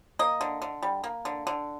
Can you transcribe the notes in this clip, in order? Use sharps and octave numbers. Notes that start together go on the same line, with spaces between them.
A#3 D#5
D3
D3
G3
A#3
D3
D3